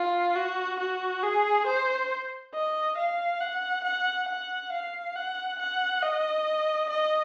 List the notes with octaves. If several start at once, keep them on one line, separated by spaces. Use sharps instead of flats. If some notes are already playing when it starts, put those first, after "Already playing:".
Already playing: F4
F#4
F#4
G#4
C5
D#5
F5
F#5
F#5
F#5
F5
F#5
F#5
D#5
D#5